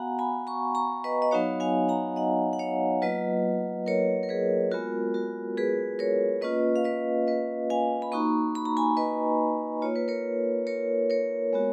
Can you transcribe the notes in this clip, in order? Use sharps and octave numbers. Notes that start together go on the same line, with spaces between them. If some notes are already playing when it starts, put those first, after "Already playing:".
Already playing: B3 F#4 F5 F#5 G#5 A#5
G#5 B5
A#5 C#6
A#5 C#6
B4 D#5
D#5
F#3 B3 D#4 F#4 C#5 F5
F5 G#5
F#5 A#5
D#5 F#5
F#5
C#5 F5
F#3 A#3 F4 B4 D#5
A#4 C#5
A#4
G#4 B4
G#3 B3 F4 F#4 A#4
F#4 A#4
G#4 B4
A#4 C#5
A#3 C#4 F4 B4 D#5
F5
B4 D#5
B4 D#5
F5 G#5
B5
A#3 D#4 F#4 A#5 C#6
B5
A#5
G#5 B5
B4 D#5
A#3 F4 C#5
B4
A#4 C#5
A#4 C#5
A#4 C#5
G#3 B3 F#4